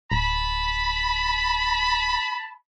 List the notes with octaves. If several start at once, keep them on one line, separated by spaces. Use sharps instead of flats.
D1 A5 B5